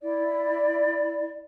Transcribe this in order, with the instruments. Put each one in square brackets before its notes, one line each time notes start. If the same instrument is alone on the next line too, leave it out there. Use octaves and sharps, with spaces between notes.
[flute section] E4 D5